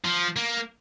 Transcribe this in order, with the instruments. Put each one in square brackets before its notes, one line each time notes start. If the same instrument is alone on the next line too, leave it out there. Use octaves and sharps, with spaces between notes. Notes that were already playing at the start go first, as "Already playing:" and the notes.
[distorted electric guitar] F3
A#3